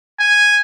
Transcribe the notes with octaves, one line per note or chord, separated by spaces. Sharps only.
G#5